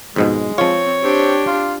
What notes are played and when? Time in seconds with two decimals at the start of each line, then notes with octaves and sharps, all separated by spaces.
0.16 F2 G#2 B2 G#3
0.58 F3 C4 F4 C#5
1.02 C4 D4 G4
1.47 F4